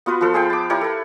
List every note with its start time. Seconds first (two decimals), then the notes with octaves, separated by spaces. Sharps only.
0.06 B3 F4 F#4 B4
0.21 F3 A4 B4
0.34 G#4 B4 F5 G5
0.50 A5 D6
0.70 E4 G4 A#4 C#5
0.81 A4 B4